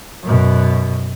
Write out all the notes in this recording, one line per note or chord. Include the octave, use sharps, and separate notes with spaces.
F#2 B2